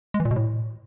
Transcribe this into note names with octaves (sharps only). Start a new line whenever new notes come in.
G#3
E3
A#2
B2
A2